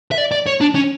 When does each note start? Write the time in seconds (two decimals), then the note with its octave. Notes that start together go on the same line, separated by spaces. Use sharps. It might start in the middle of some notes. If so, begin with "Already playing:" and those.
0.11 E5
0.18 D5
0.32 D5
0.46 C#5
0.61 D4
0.75 C#4